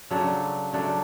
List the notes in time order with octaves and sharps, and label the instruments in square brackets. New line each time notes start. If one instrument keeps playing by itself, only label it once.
[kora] C#3 F#3 A3 D4
C#3 F#3 A3 D4